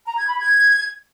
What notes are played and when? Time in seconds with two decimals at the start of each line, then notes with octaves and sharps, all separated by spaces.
0.06 A#5
0.17 G#6
0.28 B5
0.39 G#6